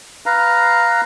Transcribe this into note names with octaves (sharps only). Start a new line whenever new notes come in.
B4 F5 A#5